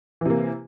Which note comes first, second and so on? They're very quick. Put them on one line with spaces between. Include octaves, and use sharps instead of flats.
E3 C3 A#3